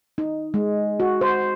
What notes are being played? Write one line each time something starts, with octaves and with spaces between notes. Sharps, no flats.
D#4
G#3
F#4
C5